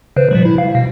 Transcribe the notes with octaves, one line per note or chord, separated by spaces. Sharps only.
C#3 B4 C5
A#2 F3 G3
E4
F5
B2